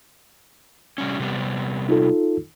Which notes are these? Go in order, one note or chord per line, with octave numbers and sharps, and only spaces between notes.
C3 G3 C#4
C3 G3 B3
D#4 F4 A4